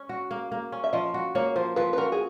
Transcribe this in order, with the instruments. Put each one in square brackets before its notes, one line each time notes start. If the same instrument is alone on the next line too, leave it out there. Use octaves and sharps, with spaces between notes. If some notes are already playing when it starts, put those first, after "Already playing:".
Already playing: [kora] C#4
F#4
A#3
A#3
C#4
[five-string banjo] E5
[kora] F3 [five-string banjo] D#5
[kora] F#4
[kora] A#3 [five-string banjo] C#5
[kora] F3 [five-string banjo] C5
[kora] F3 [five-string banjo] B4
[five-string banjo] B4
[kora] F#4 [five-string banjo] A#4
[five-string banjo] G#4